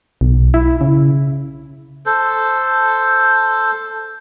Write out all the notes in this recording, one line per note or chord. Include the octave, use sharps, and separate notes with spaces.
B1
E4
C#3
A4 C5